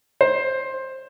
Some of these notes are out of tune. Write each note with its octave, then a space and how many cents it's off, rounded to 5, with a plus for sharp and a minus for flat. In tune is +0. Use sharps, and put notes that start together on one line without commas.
C5 +15